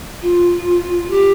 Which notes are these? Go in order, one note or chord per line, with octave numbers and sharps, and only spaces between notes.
F4
G4